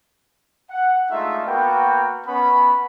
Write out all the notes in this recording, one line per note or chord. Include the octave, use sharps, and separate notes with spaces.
F#5
G#3 A3 D4 D#4 F4 E5
A#3 B3 F#4 A#4 G5
B3 C#4 B5